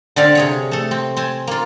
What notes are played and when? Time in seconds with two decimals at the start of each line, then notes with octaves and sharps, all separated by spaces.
0.16 D3 C4 D4 A4 D5 F5
0.35 C3 G#4 C#5
0.71 A3 A4
0.91 C4
1.17 C4 G#5 A5
1.47 A#3 F4